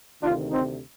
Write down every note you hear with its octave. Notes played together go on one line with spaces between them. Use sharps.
D2 C3 D#3 D4 F4
C4 D#4